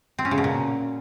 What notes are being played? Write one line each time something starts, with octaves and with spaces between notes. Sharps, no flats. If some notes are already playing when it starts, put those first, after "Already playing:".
C4
C#4
C#3
B2
A#2